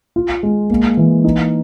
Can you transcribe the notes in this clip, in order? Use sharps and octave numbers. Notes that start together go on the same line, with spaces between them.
F4
G#3
A#3
E3
D#4